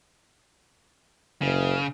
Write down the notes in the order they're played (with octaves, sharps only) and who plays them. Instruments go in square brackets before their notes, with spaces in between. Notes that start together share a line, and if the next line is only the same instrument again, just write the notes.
[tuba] F#1 [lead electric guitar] C#3